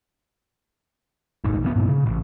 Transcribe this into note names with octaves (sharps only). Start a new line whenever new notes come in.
E1 A1 G#2
F1 F2 B3
G2 A#2
C#3
A1